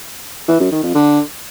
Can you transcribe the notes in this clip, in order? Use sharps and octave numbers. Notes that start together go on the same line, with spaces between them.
E3
F#2
D#3
F2
D3